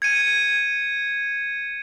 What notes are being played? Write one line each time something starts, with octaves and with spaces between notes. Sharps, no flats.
G#6 C#7 D#7